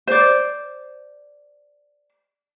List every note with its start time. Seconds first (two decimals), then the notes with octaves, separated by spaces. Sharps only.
0.07 C5 D5